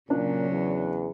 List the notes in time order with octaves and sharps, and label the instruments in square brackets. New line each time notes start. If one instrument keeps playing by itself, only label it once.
[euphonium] A#2 [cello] C#3 F#3 [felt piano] D4
[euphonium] E2